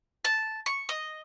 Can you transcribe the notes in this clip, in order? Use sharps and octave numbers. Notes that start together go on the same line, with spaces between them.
A5
C#6
D#5